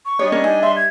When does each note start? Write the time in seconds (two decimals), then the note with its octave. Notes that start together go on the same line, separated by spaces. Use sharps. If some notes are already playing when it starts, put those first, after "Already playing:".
0.06 C#6
0.19 G3 D4 C#5 D#5
0.32 C#4 A#4 C#5
0.44 D#4 G#5
0.63 E5 C6
0.76 G#6